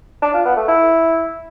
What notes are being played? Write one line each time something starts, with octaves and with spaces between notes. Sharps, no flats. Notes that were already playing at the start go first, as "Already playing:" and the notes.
D4
F4
B3
A3
E4